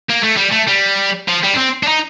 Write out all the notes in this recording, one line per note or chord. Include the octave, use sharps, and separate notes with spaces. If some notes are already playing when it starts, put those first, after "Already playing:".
A#3
A3
G3
A3
G3
F3
G3
D4
C4
D4
D#4